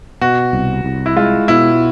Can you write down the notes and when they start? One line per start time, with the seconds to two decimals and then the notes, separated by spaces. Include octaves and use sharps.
0.21 B2 F#4
0.53 C2
0.84 C2
1.06 E4
1.16 G#3 F4
1.48 B2 E4